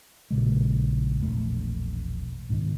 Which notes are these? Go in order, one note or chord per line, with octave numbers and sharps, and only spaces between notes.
A#1 A#2 C#3 G#3
E1 A#1 A3
C#2 G#2 B2 D#3